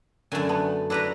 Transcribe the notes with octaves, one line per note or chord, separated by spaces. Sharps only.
F#2 D3 A3 C#4 A#4 G#5 A#5
B3 B4 G#5 A5
D4 E4 F#4 B4 D#5 A#5